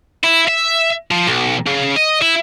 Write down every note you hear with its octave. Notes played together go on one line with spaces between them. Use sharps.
E4
E5
F3
B1
C#3
D#5
E4